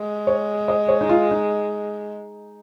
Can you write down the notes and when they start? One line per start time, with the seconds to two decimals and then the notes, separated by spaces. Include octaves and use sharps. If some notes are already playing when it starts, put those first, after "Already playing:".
Already playing: G#3
0.27 C#5
0.68 D#5
0.88 C#5
1.01 D#4
1.09 F4
1.31 D#4